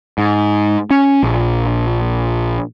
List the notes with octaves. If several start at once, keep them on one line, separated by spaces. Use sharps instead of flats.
G#2
C#4
A#1